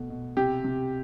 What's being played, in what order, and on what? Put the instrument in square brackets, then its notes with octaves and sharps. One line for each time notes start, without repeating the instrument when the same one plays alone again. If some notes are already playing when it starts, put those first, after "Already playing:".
Already playing: [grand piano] B2 A3
B2
[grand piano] C3 [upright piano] G4
[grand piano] C3